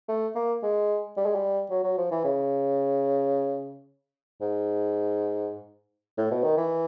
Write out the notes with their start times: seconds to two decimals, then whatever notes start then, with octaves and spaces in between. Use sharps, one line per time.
0.09 A3
0.35 A#3
0.63 G#3
1.17 G3
1.26 G#3
1.35 G3
1.70 F#3
1.84 F#3
1.98 F3
2.11 E3
2.24 C#3
4.41 G#2
6.17 A2
6.31 B2
6.44 D#3
6.57 E3